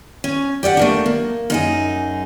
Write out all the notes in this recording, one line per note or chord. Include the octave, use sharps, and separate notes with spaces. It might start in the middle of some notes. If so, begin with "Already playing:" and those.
C#4
G4 D5 E5 F#5
A3 A#3 D4
A#3
F#2 D#4 G#4